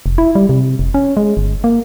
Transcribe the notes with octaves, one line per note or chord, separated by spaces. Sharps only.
F1
E4
G3
C3
F1
C#4
G#3
G1
A#3